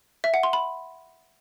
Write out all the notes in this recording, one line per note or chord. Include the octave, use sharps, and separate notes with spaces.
E5
F#5
C6
B5